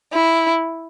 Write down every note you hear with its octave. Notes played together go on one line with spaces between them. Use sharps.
E4